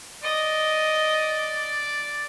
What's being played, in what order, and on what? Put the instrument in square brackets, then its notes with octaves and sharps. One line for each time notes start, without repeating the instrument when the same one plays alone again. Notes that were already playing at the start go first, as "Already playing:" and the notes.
[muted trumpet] D5 [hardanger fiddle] D#5